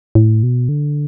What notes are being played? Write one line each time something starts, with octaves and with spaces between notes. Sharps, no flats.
A2
B2
D3